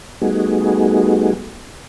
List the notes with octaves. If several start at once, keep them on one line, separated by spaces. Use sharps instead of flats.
G3 A3 B3 D#4 F#4 G#4